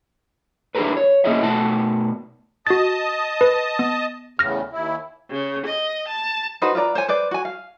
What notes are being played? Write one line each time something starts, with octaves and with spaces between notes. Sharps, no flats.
D4 E4 G4 G#4 A#4 B4
C#5
A#3 C#4 E4 G#4 D#5 E5
B2 A3 F#5 A5
F#4 D#5 A5 D#6 A6
B4
B3
E2 A2 C#3 F6 A#6
D#2 E4
C#3
D#5
A5
D#4 F#4 B4 C5
F4 B4 D5 A#5
C5 C#5 G#5
B4 C5 D5
F#4 G#5
F5